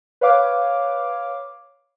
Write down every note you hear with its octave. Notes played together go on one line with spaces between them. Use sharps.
B4 C#5 F5 D6